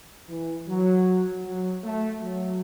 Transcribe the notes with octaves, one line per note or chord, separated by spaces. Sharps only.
E3
F#3
F#3
A3
F#3